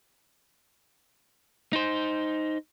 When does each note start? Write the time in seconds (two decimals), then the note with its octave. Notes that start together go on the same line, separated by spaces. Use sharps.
1.73 D#4 C5